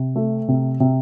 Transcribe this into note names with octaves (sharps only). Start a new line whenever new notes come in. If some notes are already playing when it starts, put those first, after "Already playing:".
Already playing: C3
A3
C3
C3